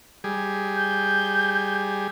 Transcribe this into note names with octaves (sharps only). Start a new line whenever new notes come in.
G3 G#4
G6